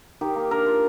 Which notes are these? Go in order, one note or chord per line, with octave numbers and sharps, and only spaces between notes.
D#3 G4
A#3
D4 A#4
F4